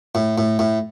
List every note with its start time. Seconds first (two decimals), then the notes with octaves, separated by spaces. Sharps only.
0.15 A2
0.38 A2
0.59 A2